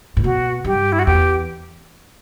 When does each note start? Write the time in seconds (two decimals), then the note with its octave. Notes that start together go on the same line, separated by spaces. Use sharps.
0.17 A2
0.24 B2 F#4
0.64 G2 G4
0.92 E4
0.99 F#4
1.06 E2 G4